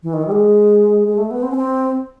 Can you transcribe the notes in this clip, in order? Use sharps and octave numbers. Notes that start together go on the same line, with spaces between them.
E3
D#3
E3
G3
G#3
G#3
A3
B3
C4
C#4
C4